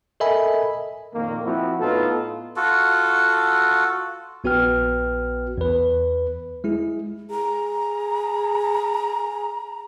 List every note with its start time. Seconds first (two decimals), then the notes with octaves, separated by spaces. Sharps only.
0.20 A4 A#4 D#5 E5 G#5 B5
1.14 F2 A#2 D#3 A#3
1.44 F3 C4 E4 F#4
1.80 A2 B3 D#4 F4 A4
2.56 F4 F#4 A4
4.44 A#1 B3 F#4 B4 G5 F6
5.58 E2 B4
6.64 G#3 E4 G#4
7.31 G#4 A#5